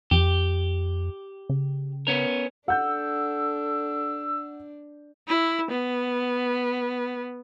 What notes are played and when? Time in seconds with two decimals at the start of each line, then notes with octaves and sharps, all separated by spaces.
0.11 F2 G4
1.49 C#3
2.07 B3 C#4 A#4
2.68 D4 A4 F#5 E6 G6
5.28 E4
5.71 B3